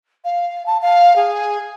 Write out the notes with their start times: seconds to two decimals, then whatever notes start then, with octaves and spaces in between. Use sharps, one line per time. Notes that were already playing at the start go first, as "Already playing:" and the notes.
0.24 F5
0.66 A5
0.82 F5
1.16 G#4